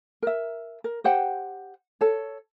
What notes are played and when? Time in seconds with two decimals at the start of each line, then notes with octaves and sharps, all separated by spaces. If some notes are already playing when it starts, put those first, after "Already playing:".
0.22 A#4 E5
0.84 A#4
1.04 G4 C5 F#5 G5
2.01 A4 C#5